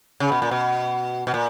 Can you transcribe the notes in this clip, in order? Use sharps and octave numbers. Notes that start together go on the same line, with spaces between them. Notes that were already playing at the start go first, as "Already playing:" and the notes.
C#3
B2
A#2
B2
B2
A#2